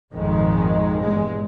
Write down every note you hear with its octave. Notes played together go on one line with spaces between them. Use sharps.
G#1 F2 A#2 D#3 G#3
E2 G2 A#2 G#3